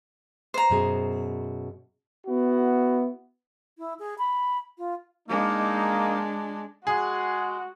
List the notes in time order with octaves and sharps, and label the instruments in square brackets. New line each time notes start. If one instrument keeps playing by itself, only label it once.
[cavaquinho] C5 A#5
[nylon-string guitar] F#2 B2 G#4
[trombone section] B3 E4 F#4
[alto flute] E4
G#4
B5
F4
[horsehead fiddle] G#3 D4 [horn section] A#3 D#4
[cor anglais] G#3 [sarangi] F#4 [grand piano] G#4